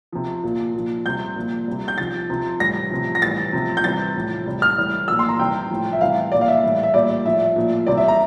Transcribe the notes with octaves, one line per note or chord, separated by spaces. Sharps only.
C3 F3
A#2 F3
A#2 F3
C3 G3 G6
A#2 F3
C3 G3
G6
C3 F3 A6
C3 F3
A2 E3 G3 A#6
C3 F3
A#6
A2 E3 G3 A6
C3 F3
G6
C3 E3 G3 A6
A2 F3
C3 G3
F6
A2 E3 G3
A#2 F3 E6
C6
A#5
C3 E3 G3 G5
A2 F3
E5
C3 E3 G3 F5
A#2 F3 D5
F5
E5
A2 E3 G3
E5
A#2 G3 D5
A2 F3 E5
A#2 F3
C3 E3 G3 D5
E5
A#5